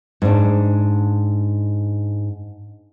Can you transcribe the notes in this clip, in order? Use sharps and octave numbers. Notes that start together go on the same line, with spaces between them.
G#2 D4